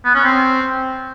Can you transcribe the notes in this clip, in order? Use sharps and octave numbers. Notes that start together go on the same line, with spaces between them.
B3
C#4
C4